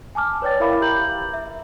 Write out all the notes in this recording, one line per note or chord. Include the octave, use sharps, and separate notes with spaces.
G#5 A5 D6 F6
B4 C#5 D5 G5 A6
E4 A#4 E5 F5 B5 D6
G4 A#5 G6 F#7
E5